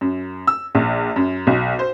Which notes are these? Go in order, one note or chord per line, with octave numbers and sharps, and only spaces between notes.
F#2
E6
A#1
F#2
B1
C5